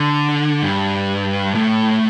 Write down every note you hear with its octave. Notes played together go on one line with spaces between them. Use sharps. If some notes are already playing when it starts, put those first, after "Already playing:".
Already playing: D3
G2
A2